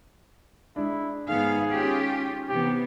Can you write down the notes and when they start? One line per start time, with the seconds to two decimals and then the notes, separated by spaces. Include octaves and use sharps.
0.76 G#3 D4 E4
1.28 G#2 D#3 B3 G#4 F5
1.70 C#4 F4 G4
2.49 C3 E3 B3 G4